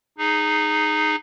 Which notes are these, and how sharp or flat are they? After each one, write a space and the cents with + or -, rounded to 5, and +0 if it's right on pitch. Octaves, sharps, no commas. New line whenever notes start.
D#4 -15 G#4 +0